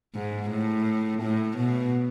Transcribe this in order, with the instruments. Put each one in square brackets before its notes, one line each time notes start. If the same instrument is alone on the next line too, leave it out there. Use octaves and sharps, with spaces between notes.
[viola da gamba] G#2
A2
A2
B2